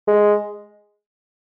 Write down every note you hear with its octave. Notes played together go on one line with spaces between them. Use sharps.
G#3